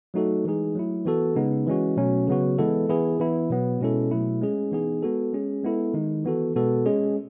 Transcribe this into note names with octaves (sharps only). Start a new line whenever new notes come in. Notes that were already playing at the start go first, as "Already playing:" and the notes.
F#3 A3 D#4 F#4 A4
E3 G#3 D#4 G#4
F#3 A3 E4
E3 B3 F#4 A4
C#3 G#3 B3 D#4
E3 G#3 C#4 F#4
B2 F#3 A3 C#4
C#3 F#3 B3 F#4
E3 G#3 B3 E4 A4
E3 B3 E4 G#4
E3 B3 E4
B2 F#3 B3
B2 G#3 C#4 E4 A4
B2 F#3 A3 E4
G#3 C#4 G#4
E3 B3 D#4 G#4
G#3 B3 F#4 A4
G#3 C#4 G#4
G#3 B3 E4 A4
D#3 G#3 D#4
E3 B3 F#4 A4
B2 G#3 B3 F#4 A4
G#3 C#4 G#4